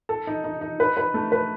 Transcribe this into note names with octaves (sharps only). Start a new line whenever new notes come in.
A4
D#4
D#4
D#4
B4
B4
A3
B4